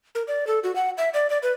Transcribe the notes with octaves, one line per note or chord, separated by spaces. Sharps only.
A#4
D5
A4
F#4
F#5
E5
D5
D5
B4